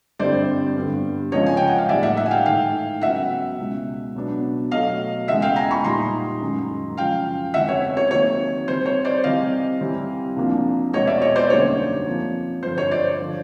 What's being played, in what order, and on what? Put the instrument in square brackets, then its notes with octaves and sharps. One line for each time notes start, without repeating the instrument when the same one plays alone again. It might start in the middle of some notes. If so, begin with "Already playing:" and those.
[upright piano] G2 D3 G3 C4 E4 [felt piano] C5 D5
[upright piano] G2 D3 G3 B3
[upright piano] C#2 C#3 F3 G#3 [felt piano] C#5 D#5
[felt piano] G#5
G5
F#5
F5
[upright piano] A2 E3 G3 A#3 D#4 [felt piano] D5 E5
[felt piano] E5 F#5
E5 F#5
G#5
F5 G5
[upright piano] G#2 E3 A3 [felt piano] F5 G5
[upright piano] C#3 F#3 B3 [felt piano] E5 F#5
[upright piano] C#2 B2 G#3
B2 F#3 B3 D4
[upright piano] B2 F#3 A3 [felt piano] D#5 F5
[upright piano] E2 C#3 E3 G#3 [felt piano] E5 F#5
[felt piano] F5 G5
G#5 A#5
B5 C#6
[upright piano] A#2 G3 A#3 D#4 [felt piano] A#5 C6
[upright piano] F#2 D#3 G#3
[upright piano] F#2 C#3 F3 [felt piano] F5 G5
[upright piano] E2 C#3 E3 G#3 C4 [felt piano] E5 F#5
[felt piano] C#5
C#5
[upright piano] C3 D#3 F#3 A#3 D#4 [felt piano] C#5
[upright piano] C3 E3 G3 [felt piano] C5
[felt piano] C#5
C5 D5
[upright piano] C3 E3 G3 [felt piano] D#5 F5
[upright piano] C3 E3 G3 C4 E4
C2 C3 F3 A#3 D4
[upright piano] E2 B2 G#3 B3 [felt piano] C#5 D#5
[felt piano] D5 E5
C#5 D#5
C5 D5
[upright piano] F#2 D3 G3 A#3 D#4 [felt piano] C#5
[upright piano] C3 F3 A#3
[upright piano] G2 D3 F3 [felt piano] C5
[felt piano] C#5
C5 D5
[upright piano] D3 F3